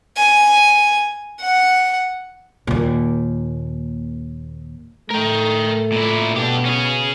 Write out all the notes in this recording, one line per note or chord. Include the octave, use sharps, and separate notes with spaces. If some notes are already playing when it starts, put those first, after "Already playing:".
G#5
F#5
D#2 A#2
A2 A3 A#4 G5
A#2 E4
B2 D4 G4
C#4 G#4